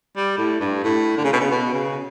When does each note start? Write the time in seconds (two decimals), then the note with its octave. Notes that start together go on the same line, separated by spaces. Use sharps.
0.16 G3
0.38 A2
0.60 G2
0.84 A2
1.17 D3
1.24 C#3
1.33 B2
1.41 C#3
1.51 B2
1.73 C#3